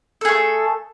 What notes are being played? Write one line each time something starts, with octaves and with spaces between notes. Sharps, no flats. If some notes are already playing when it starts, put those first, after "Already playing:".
A3 G#4 A4